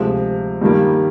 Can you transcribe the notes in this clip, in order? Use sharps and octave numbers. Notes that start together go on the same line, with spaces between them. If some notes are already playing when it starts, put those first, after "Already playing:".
Already playing: D2 C3 F3 G#3 F5
G2 D#3 G3 A#3